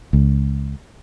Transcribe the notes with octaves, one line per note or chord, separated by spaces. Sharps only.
C#2